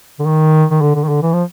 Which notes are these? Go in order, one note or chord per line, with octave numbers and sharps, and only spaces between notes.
D3
D#3
D#3
D3
D3
D#3
D3
E3
F3